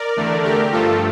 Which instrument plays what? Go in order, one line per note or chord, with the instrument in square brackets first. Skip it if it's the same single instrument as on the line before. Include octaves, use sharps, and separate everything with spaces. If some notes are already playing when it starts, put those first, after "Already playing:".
Already playing: [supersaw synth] A#4 D5
E2 D3 A3
G4 A#4
G2 F3 A3 F4 A4